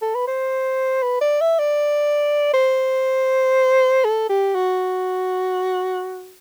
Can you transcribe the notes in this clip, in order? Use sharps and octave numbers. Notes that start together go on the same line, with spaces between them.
A4
B4
C5
B4
D5
E5
D5
C5
A4
G4
F#4